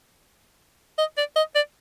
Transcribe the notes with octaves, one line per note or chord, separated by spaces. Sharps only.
D#5
D5
D#5
D5